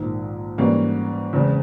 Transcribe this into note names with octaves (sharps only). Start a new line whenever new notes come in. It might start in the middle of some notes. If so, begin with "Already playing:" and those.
Already playing: A#1 G#2 D#3
G#2 E3 G3 A#3 C#4
E2 C#3 E3 G#3 C4